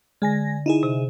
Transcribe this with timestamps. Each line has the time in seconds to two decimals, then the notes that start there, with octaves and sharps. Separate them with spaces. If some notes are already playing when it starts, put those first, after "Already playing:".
0.22 D3 G#3 G#5 A#6
0.66 D#4 E4 G#4
0.83 C3